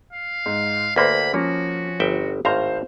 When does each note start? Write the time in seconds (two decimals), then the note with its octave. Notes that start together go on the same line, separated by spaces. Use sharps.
0.13 F5
0.46 G#2
0.96 D2 A#3 B4 C5 B5
1.34 F3 A#3 C#4 F#4
2.00 G1 E5 G5
2.45 G#1 A2 C5 F5 A#5